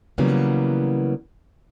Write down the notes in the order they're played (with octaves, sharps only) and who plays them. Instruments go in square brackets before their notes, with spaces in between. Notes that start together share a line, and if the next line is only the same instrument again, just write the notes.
[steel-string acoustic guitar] C#3 E3 F#3 G3 A#3 B3